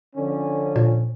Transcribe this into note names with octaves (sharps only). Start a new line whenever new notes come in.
D3 F3 C#4
A#2